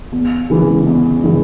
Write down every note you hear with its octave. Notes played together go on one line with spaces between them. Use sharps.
E2
C#3 E3 G#3
E2
C#3 E3 G#3